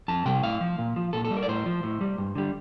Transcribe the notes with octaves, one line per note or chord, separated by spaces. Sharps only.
F2 A5
C3 G3 G5
A2 F5
F3
A#2
F3
A#2 A4
A4
G3
A#4
D5
A2 C5
F3
A2
G3
G2
D3 G3